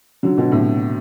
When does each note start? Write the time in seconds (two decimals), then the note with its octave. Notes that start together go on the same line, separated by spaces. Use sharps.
0.23 D3 F#3
0.38 B2 D3
0.51 A2 C3